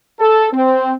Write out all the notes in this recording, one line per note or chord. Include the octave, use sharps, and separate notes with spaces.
A4
C4